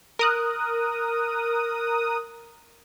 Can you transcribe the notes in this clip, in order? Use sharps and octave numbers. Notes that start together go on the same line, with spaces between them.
A#4 D#6 F#6